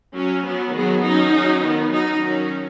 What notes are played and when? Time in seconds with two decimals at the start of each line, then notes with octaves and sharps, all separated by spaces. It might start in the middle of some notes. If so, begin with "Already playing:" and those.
0.16 F#3 C#4
0.46 F#3 B3
0.75 D#3 F#3 B3 G#4
1.04 F#3 C#4 D#4
1.34 F#3 C#4
1.64 D#3 B3
1.92 F#3 C#4 D#4
2.22 D#3 F#3 C#4